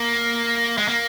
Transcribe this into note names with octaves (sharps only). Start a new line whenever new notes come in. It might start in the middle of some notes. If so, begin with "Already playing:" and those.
Already playing: A#3
G#3
A#3